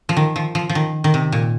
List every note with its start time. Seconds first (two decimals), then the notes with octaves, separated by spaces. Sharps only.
0.09 F3
0.17 D#3
0.36 F3
0.55 F3
0.69 F3
0.75 D#3
1.04 D#3
1.14 C3
1.32 A#2